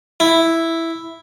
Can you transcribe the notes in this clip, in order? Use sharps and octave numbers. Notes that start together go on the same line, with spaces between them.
E4